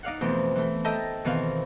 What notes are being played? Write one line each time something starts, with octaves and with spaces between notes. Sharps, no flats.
D#4 D5 F5 F#5
F2 B2 E3 A3 C4
E3 A3
A4 D#5 E5 G5 A5 A#5
B2 D#3 E3 C4 F5